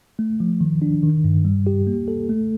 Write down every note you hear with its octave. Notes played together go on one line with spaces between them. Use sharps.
A3
F3
D#3
D4
D#3
G2
G3
G4
A#3
A4
A3